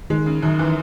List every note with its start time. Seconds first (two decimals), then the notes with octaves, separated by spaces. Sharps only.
0.10 D#3 G#3
0.26 C#3
0.43 F#2 D#3
0.59 E3